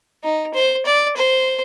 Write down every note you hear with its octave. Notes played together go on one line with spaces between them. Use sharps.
D#4
C5
D5
C5